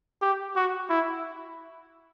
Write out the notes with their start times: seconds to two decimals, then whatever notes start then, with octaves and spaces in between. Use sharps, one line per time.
0.22 G4
0.56 F#4
0.90 E4